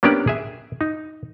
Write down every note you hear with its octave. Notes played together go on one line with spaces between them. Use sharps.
A#3 B3 C#4 D4 G4 D5
G#4 E5
D#4